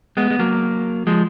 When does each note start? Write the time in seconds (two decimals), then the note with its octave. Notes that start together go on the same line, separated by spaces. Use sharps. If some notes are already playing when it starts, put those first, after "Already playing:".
0.17 G#3 B3
0.31 G#3
0.39 F#3 A#3
1.07 F3 G#3